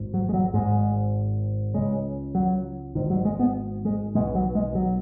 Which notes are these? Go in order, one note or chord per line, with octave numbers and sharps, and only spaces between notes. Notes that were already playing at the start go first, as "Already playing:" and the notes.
Already playing: G#1 G#2
F#3
G#3
F#3
G#1 G#2 G#3
C#2 C#3 G#3
F#3
G#1 G#2 D#3
F#3
G#3
B3
G#3
B1 B2 G#3
F#3
G#3
F#3